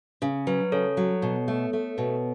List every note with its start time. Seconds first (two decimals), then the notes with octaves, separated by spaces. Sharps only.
0.22 C#3
0.47 F#3 B4
0.72 C#3 A4 C#5
0.97 F#3
1.22 B2
1.48 A3
1.73 A3
1.98 B2